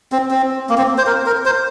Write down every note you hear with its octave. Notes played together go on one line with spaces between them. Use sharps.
C4
C4
A#3
C4
C5
A#4
A#4
C5